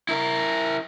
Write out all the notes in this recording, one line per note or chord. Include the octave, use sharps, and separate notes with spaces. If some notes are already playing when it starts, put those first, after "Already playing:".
E4 A#4